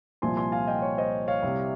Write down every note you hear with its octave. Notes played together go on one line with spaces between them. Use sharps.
C2 A#2 F3 G#5 C6
G#5 C6
F5 G#5
D#5 G5
C#5
C5 D#5
C#5 F5
C2 C3 G3